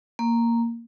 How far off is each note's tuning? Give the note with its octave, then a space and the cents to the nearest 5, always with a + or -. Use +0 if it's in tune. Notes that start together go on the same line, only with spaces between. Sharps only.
A#3 -5